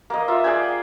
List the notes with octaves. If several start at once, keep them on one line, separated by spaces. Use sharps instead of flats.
A#3 D#5
F4 E5 A#5
G#4 D5 G5 G#5